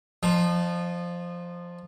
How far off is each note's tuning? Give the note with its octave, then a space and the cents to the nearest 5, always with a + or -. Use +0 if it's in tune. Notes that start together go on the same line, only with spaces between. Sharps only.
F3 +0 D#4 -35